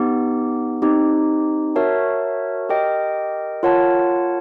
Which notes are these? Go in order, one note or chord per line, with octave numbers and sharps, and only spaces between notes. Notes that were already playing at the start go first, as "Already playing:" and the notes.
Already playing: B3 D#4 G4
C4 D#4 G4
F#4 A#4 C#5 E5 A5
G4 A#4 D#5 G5
F4 A#4 C#5 F#5 A5